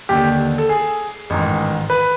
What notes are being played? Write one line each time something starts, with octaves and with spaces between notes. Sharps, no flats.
D#2 D3 G4
A4
G#4
A1 G#2 D#3
B4